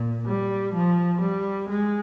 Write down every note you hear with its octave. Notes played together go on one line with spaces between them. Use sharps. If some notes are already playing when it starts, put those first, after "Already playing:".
Already playing: A#2
G3
F3
G3
G#3